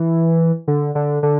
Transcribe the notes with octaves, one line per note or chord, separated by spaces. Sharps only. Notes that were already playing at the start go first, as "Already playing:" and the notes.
Already playing: E3
D3
D3
D3